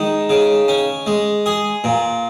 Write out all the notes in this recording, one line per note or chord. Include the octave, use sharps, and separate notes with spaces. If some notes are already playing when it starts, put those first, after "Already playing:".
Already playing: D#3 G#3
C#3
C#4
G#3
G#4
A#2